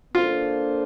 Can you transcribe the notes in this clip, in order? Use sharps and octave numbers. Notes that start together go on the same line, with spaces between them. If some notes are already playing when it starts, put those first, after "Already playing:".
A#3 D4 F4 A4 C5